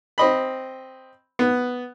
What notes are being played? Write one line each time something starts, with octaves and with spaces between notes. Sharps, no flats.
C4 D#5 B5
B3